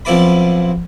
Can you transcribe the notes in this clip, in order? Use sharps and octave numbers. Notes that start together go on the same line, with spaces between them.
B1 F3 C4 E4 D5 B5